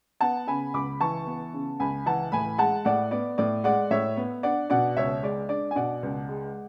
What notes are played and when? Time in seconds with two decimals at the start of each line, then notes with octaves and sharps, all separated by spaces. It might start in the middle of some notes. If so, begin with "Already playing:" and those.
0.21 B3 F#5 A5
0.47 C#3 G#5 B5
0.74 C#2 B5 D6
1.01 E3 A5 C#6
1.27 B3
1.53 C#3
1.80 C#2 G#5 B5
2.06 E3 F#5 A5
2.32 A2 G#5 B5
2.58 G#3 F#5 A5
2.85 A2 D5 F#5
3.11 B3 D5
3.38 A2 D5
3.64 G#3 D5 F#5
3.91 A2 C#5 E5
4.17 B3
4.43 D4 D5 F#5
4.70 B2 D5 F#5
4.97 C#2 C#5 E5
5.23 G#3 D5
5.49 D4 D5
5.71 G#5
5.76 B2 D5 F#5
6.03 C#2
6.29 G#3